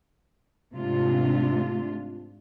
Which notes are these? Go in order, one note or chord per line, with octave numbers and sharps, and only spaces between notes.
G#2 C3 A3 D4 F4